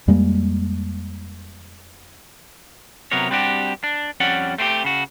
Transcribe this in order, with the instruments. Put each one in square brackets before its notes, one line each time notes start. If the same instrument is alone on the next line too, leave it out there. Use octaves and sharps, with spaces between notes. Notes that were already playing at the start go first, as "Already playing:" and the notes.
[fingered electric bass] F2 G3 G#3 A#3
[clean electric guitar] C3 F#3 B3 A#4 C#5
G3 C4 D4 F#4 G4
D4
F2 G3 C#4 D5 F#5
A3 C4 E4 G4
C#3 F#4